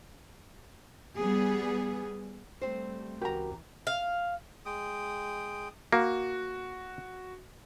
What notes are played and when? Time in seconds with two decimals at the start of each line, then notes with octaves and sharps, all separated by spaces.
1.17 G3 B3 G#4
2.61 G3 A3 C4 C5
3.21 C#2 E3 F#4 G4 A#4 A#5
3.87 F5
4.66 G#3 G5 D#6
5.92 A#3 F#4